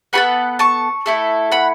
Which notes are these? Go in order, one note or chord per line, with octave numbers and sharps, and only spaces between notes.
B3 F#4 A4 F#5 B5
A5 C#6
A3 E4 A4
F#5 B5